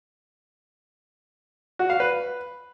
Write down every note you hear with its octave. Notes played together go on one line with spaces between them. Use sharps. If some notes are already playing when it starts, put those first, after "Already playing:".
F#4
F5
B4